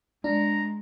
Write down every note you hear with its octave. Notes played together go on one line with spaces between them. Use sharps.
G#3 D4 A#5